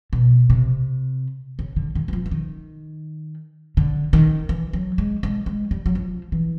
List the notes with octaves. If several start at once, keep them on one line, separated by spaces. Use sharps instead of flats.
B2
C3
C#3
D3
D#3
E3
F3
E3
D#3
D3
D#3
E3
F#3
G#3
G#3
G#3
G3
F#3
F3
E3